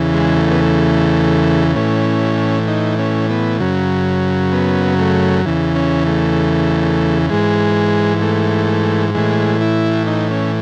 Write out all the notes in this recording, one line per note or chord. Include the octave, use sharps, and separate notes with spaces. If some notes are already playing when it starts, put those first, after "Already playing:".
Already playing: E2 C#3 E3
G#3
A3
B3
A3
A2 E3 C#4
D#4
C#4
B3
F#2 C#3 F#3
B3
A3
E2 C#3 E3
C#4
A3
G#2 E3 G#3
A3
A2 E3 G#3
E4
D#4
C#4